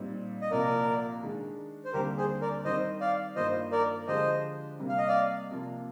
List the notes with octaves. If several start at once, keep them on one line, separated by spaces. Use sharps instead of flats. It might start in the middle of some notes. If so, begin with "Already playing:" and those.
Already playing: A#2 G3 C4 D#4
D#5
C2 A#2 F3 A#3 A#4 D5
D#3 G#3 D4
C5
D#2 D3 G3 C4 G4 A#4
G#4 C5
A#4 D5
D#3 G3 C4 D#4 A#4 C5 D#5
D5 F5
G2 D#3 A#3 F4 C5 D#5
A#4 D5
D3 F3 G#3 D4 G4 C5 D#5
C3 G3 A#3
F5
D#5
D5 F5
C3 F3 A#3 F4